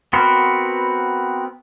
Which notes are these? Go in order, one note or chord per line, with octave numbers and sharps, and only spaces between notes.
B3 C4 F#4 A#4 B4